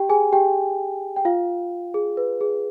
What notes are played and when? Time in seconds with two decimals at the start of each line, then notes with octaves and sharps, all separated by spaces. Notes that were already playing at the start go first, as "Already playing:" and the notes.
Already playing: G4 G5
0.09 G#4 G#5
0.33 G4 G5
1.16 G5
1.25 F4 F5
1.94 G#4
2.17 B4
2.41 G#4